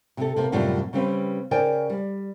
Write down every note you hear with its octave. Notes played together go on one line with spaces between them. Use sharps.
C3 A4
C3 A#3
F#2 A2 C3 F3 G3 D4
C#3 G3 C4 B4
C#3 A#4 C5 D5 G5 G#5
G3